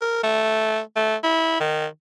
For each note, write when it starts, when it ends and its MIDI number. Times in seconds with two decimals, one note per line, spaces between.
0.01 0.19 70
0.23 0.80 57
0.96 1.16 57
1.23 1.56 64
1.60 1.86 51